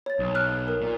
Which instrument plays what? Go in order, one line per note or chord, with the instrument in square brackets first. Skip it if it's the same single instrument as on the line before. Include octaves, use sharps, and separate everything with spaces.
[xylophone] C#5 A6
[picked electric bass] B1
[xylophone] F6 F#6
A#4
[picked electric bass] A#2